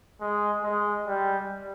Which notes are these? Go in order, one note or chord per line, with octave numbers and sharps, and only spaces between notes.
G#3
G#3
G3